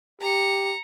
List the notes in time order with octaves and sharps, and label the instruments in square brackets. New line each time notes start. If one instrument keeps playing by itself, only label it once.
[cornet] G4 [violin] A#5 C#7